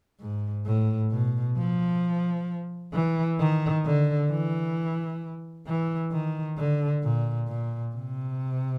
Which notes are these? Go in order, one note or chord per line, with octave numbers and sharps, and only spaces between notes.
G#2
A2
B2
F3
E3
D#3
D3
E3
E3
D#3
D3
A#2
A#2
C3